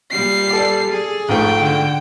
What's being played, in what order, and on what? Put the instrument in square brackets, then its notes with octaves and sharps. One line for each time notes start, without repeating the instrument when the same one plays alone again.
[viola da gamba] A#2 G3 [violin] C7
[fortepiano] A4 D5
[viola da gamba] G#4
[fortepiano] A#1 G#2 A3 [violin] G5
[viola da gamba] D3